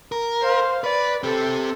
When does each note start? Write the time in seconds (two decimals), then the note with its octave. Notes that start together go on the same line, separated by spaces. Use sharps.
0.12 A#4
0.42 C5 F5
0.84 B4 D5
1.23 C4 G4 A4